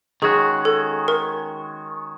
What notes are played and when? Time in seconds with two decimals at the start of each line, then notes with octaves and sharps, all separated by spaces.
0.22 D#3 G#3 C#4 F#4 G#4
0.65 A4
1.08 A#4